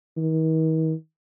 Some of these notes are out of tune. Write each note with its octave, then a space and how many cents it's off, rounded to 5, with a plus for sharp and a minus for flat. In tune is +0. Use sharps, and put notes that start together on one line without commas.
D#3 +45